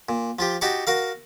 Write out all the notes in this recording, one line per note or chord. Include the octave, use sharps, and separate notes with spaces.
A#2
F3 F4 G4
D#4 F#4 G4 A5 C#6
F#4 A#4 F5